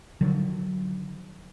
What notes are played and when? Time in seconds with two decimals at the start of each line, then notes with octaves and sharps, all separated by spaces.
0.21 D3 D#3 F3 F#3